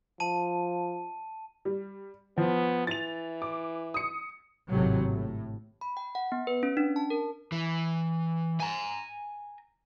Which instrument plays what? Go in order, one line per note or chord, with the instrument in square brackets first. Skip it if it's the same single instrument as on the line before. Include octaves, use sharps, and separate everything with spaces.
[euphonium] F3 [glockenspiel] A5 D#7
[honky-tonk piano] G3
[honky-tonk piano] F3 [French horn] B3
[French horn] E3 [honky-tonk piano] A6 F7
[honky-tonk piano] D6
D#6 C#7
[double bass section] G#1 A2 C3 F#3
A2
[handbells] B5
G5
F#5
B3
B4
C#4
D4
A5
A#4
[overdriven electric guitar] E3
G#5 A#5